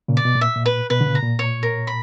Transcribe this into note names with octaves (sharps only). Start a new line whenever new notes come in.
A#2 C#3
D5
B2
A#2
E5
A#2
B4
B2 B4
D3
A#2 C#3
A#5
A#2
C#5
A#4
B5